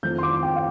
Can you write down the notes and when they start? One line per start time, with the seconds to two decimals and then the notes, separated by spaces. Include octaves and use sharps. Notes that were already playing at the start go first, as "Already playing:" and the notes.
0.03 F2 D#3 A3 G6
0.18 C6
0.23 D6
0.43 G5
0.56 F5